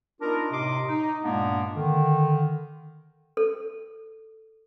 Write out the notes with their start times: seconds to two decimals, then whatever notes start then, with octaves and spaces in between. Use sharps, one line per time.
0.21 B3 D4 D#4 F4 A#4
0.52 A2 C3 D#4 D#5 C6 D6
0.89 D#4
1.24 G2 A#2 G#3 A#3 B3 D4
1.74 D3 D#3
3.37 A4